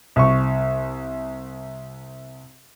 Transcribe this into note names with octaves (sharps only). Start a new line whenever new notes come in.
C2 C#6